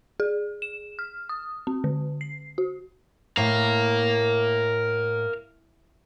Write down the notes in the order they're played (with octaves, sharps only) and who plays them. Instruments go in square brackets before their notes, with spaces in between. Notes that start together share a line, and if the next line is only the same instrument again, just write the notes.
[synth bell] G#4
E7
F6
D#6
C4
D3
C7
F#4
[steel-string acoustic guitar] A2 [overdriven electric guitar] A#4 F5